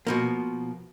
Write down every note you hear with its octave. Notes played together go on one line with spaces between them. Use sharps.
B2 F3 A#3